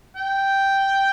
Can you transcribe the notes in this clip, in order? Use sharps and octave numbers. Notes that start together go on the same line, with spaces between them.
G5